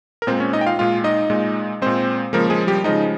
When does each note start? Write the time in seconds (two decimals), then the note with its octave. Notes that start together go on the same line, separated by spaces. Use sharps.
0.22 A#4
0.27 A#2 G#3 C4 C5
0.40 C#4 C#5
0.53 D#4 D#5
0.61 G5
0.66 F4 F5
0.79 A#2 G#3 F4 F5
1.04 D#4 D#5
1.30 A#2 G#3
1.82 A#2 G#3 C4 C5
2.33 C#3 F3 G#3 A#3 A#4
2.50 G#3 G#4
2.67 G3 G4
2.84 C#3 F3 G#3 D#4 D#5